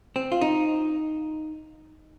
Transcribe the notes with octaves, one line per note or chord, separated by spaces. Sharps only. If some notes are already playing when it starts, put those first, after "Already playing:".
C4
F4
D#4